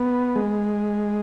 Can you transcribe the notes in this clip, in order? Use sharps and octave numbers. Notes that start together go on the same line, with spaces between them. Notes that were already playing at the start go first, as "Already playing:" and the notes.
Already playing: B3
G#3